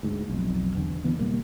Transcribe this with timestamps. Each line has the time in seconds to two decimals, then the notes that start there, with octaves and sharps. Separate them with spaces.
0.03 D2 G#2
0.29 B1 F2
0.75 E2 D3
1.04 D3 E3 B3
1.19 B2 G3 A#3